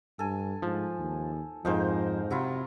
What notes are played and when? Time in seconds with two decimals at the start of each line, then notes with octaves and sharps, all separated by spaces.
0.19 G2 A4 G#5
0.62 G#2 F3
0.99 D#2
1.65 F2 G#2 F3 D#4 A#4 C5
2.31 C3 F#3 E4 F4